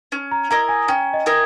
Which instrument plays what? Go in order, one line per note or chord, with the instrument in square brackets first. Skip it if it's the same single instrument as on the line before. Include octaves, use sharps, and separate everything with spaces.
[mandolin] C#4
[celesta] A#5
[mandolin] E4 A#4 D#5 [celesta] A#5
[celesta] G#5
[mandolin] C#4 [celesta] G5
[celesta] D#5
[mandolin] E4 A#4 D#5